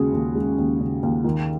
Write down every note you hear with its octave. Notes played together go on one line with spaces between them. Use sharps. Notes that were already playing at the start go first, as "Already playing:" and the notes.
Already playing: D#2 C#3 G#3 F#4 G#4
D#2
G#3
D#2
C#3
D#2
D#3